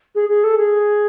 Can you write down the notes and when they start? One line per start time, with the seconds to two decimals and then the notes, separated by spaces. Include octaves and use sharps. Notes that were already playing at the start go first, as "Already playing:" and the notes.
0.15 G#4
0.29 G#4
0.44 A4
0.57 G#4